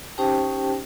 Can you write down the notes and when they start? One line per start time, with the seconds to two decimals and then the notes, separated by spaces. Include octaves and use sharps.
0.18 C#4 D#4 G4 C5 G5 A5